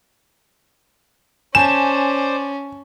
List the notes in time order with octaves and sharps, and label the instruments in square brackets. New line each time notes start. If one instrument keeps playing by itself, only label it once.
[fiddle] C#4 [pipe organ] C5 D5 [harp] G#5 A5 G6 [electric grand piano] E7